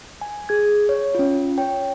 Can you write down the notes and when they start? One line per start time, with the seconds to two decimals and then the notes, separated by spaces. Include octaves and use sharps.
0.21 G#5
0.49 G#4 G#6
0.89 C#5
1.15 C#4 F4
1.58 C#5 G5